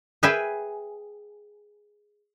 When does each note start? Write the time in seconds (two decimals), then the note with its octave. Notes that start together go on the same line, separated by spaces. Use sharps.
0.23 G#4 B4 E5 G5 G#5